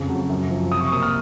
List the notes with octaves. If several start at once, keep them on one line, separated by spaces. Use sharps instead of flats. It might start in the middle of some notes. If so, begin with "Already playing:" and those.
Already playing: F2 C#3
F#3
F#2
F3
C3 D#6
C#6
A#3 D#6
F6